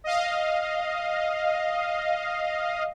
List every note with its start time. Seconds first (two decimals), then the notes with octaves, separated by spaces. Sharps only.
0.04 D#5 F5